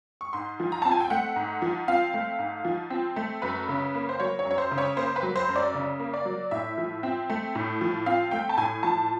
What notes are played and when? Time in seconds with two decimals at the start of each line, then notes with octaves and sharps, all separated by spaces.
0.21 C#6
0.33 G#2 C6
0.60 F3
0.72 A#5
0.82 C4 A5
0.91 G#5
1.00 G5
1.10 A3 F#5
1.36 G#2
1.62 F3
1.88 C4 F5
2.14 A3
2.39 G#2
2.65 F3
2.90 C4
3.16 A3
3.42 F#2 B4
3.68 C#3
3.95 A#3
4.09 C5
4.20 F#3 C#5
4.39 C#5
4.45 F#2
4.51 C#5
4.58 C5
4.71 C#3
4.78 C#5
4.97 A#3 C5
5.16 B4
5.23 F#3
5.36 C5
5.49 F#2
5.56 D5
5.74 C#3
6.00 A#3
6.14 D5
6.25 F#3
6.51 A2 E5
6.78 F3
7.03 C4
7.30 A3
7.55 A2
7.81 F3
8.06 C4 F5
8.31 A3 G5
8.49 A5
8.58 A2 G#5
8.83 F3 A5